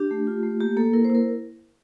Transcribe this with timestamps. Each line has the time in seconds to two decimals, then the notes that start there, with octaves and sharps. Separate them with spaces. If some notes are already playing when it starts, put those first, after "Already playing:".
Already playing: D4 G4
0.11 A3
0.27 F4
0.43 A3
0.60 A#3 G4
0.77 A#3 A4
0.93 E4 A#4
1.05 C5
1.09 E4
1.15 A#4